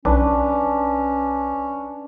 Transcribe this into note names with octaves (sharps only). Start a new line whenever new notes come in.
B1 C#4 D4 B4